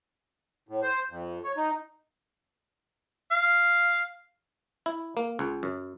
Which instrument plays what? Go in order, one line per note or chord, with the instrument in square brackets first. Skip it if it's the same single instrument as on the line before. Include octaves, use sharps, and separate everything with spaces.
[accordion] A2
C5
F2
C#5
D#4
[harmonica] F5
[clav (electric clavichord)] E4
A#3
C#2
F#2